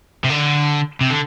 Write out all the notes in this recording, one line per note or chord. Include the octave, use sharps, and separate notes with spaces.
C3
D3
C3
D3